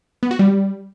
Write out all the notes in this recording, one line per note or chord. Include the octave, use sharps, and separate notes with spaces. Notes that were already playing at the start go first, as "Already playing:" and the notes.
B3
F#4
G3